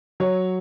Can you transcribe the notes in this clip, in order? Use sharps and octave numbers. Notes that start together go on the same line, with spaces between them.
F#3 C#5